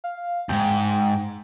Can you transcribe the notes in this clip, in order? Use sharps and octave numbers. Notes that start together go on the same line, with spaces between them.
F5
D#2 G#2 G5